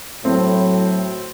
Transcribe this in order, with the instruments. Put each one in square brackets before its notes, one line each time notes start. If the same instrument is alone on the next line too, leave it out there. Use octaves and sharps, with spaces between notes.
[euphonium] A2 [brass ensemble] F#3 [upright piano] C4